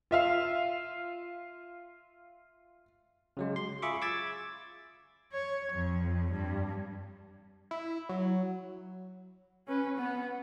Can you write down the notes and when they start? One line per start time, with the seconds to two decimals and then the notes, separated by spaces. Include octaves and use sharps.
0.11 F4 E5 F5
3.37 C#3 F#3 G#3
3.56 C6
3.82 F4 G#4 E5 B5 C#6 D6
4.02 D6 E6 G#6 A6
5.33 C#5
5.73 F2
6.32 G2
7.71 E4
8.09 F#3
9.68 C#4 B4
9.98 B3